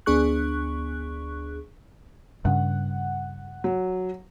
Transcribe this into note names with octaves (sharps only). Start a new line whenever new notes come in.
D2 B3 D4 G#4 C#6 F#6
G2 C#3 F#5
F#3